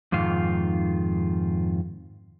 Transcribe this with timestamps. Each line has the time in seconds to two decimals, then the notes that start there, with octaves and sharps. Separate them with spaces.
0.12 F2 G#2 D#3 F4